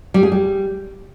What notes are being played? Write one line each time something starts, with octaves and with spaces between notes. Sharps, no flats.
G3
G#4
G3